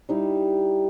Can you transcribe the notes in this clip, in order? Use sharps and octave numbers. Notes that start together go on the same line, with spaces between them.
G3 D#4 E4